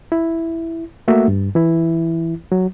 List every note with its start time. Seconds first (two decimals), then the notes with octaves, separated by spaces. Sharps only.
0.12 E4
1.08 A3 A#3 F#4 E5
1.28 G2
1.55 E3 E4
2.52 F#3